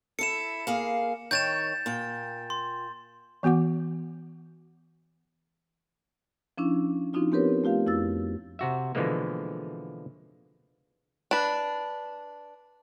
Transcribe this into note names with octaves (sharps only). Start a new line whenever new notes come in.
E4 A4 C#7 E7
A#3 G#4 F5
D#3 C#5 G5 G6 A6 E7
A#2 G5
C6
E3 B3 F#4 F#5 D6
F3 C#4 D4 E4
F3 C4 D4 D#4 F4 F#4
B3 C4 G4 A#4 B4 C#5
A3 F4 G4 F5
F2 E4 F#4 E6 A6
C3 F#4 E5
B2 D3 E3 F3 G#3 A#3
D4 B4